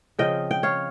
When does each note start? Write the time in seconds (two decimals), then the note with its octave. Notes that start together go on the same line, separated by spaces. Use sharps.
0.19 C#3 F3 C4 D#5 G5
0.51 G5
0.63 C#5 F5